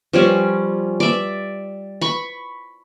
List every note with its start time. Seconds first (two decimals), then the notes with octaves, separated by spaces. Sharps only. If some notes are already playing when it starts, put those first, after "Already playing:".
0.13 F3 G3 C#4
1.00 D5 E5
2.01 B5 C#6